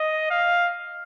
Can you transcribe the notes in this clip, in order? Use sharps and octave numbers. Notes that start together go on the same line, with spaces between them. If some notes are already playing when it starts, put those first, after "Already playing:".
Already playing: D#5
F5